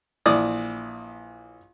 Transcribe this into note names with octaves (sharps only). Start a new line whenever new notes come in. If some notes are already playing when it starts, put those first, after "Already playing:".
A#1 E3 D5 D#6